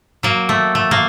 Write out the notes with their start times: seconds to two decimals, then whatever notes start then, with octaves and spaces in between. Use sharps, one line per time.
0.23 F#3 A#3
0.49 A3
0.75 A3
0.91 A#3